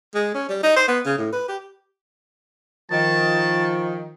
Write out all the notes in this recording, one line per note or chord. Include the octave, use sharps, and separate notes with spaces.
G#3
C#4
G3
D#4
C5
B3
C#3
A2
B4
G4
D#3 F3 A5